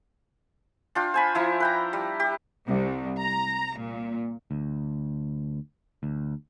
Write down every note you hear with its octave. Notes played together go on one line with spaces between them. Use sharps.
D4 F4 G5
C5 G#5 B5
F3 E4 A#5
B4 G5 A#5
G3
G4
C2
A#5
A#2
D2
D2